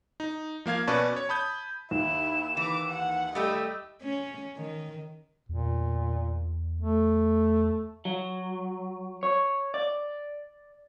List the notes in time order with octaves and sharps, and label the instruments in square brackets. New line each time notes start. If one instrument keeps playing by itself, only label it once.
[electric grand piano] D#4
F3 A#3 F5 G#6
B2 C#4 B4 D5 A5 C#6
C#5
A5 B5 D#6 G6
[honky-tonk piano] D#2 [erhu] E4 [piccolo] E7
[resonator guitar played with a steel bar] E3 [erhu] D6
[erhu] F#5
[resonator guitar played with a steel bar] G3 A3 G4 [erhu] D#5 [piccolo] E6
[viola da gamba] C#4
D#3
[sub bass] E2 [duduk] A#2
[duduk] A3
[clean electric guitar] F#3
C#5
D5